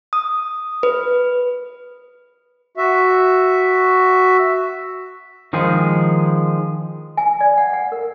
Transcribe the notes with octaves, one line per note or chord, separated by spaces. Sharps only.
D#6
B4
F#4 E5
D#3 F3 G#3 G#4
G#5
D5
F#5
F#5
A#4